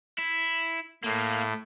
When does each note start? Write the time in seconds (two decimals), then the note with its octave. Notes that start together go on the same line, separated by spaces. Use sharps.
0.18 E4
1.04 A2 A#3